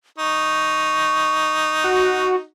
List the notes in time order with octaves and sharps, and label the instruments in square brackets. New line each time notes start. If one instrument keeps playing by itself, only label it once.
[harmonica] D#4 [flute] C#6
[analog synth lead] F#4